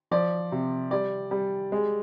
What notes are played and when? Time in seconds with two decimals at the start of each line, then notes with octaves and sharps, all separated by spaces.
0.11 F3 D5
0.52 C3
0.91 G3 D5
1.31 G3
1.72 G#3